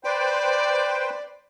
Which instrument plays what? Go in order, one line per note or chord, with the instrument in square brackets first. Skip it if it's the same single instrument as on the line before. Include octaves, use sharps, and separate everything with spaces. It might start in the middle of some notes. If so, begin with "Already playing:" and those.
[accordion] B4 C5 G5 [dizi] D5